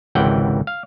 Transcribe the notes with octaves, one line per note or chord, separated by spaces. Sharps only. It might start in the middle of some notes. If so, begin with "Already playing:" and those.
G#1 C#2 C3 E3 F#5 G5
F5